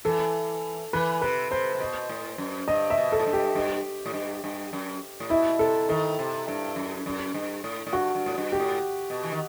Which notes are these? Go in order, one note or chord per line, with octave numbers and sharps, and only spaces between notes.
E3 A4
E3 B4
C3 B4
C3 C5
C3
B2
A2
F#2
G2 D#5
E5
B2
A4
A2
G2
G4
G2
A2
G2
G2
F#2
A2
B2 E4
C3 A4
D#3 A4
C3
G2
F#2
F#2
G2
A2
A2
G2 F#4
G2
A2
G2
G4
A2
B2
E3
D#3